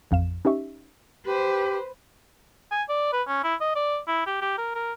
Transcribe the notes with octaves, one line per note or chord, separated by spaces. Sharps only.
A1 F2 F5 E7
C#4 D#4 G4 E5 C#6
G4 B4 C5
G#5
D5
B4
C#4
E4
D#5
D5
E4
G4
G4
A#4
A#4